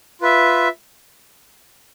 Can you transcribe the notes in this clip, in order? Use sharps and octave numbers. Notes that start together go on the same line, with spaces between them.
F4 B4 E5